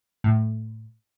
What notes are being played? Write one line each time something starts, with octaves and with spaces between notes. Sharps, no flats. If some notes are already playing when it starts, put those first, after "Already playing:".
A2